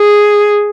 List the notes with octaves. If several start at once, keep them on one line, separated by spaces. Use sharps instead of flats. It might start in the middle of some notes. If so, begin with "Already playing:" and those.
Already playing: G#4